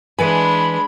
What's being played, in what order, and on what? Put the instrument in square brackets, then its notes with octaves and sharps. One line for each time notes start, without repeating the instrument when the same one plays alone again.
[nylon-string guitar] E3 B4 G#5 [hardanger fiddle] G#3 D4 [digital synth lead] B5